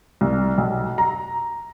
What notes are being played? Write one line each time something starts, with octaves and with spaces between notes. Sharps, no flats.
C2
B1
A#5